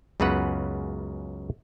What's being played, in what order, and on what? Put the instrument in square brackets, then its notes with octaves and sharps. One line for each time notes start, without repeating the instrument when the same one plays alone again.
[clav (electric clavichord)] C#2 F#2 C#3 B3 B4 F#5